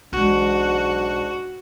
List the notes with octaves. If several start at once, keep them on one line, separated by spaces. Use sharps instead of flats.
B1 G#2 E3 G#3 D4 F#4